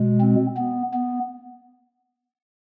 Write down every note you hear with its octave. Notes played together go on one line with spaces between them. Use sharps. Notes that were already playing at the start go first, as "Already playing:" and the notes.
Already playing: B2 G#3
C4
B3
B3